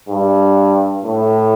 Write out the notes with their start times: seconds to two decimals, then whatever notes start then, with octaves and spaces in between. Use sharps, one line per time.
0.09 G2
1.04 A2